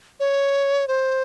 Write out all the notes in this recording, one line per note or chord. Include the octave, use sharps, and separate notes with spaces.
C#5
C5